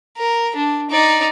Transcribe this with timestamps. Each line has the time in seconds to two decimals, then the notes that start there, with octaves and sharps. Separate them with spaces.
0.18 A#4
0.56 D4
0.91 D#4 D5